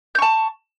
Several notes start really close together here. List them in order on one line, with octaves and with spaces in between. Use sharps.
G6 C#6 A5